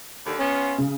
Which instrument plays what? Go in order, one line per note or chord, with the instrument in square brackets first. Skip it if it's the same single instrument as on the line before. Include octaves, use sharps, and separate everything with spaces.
[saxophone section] D#2 D3
[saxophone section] B3 F4 [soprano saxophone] C#4
[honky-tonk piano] C#3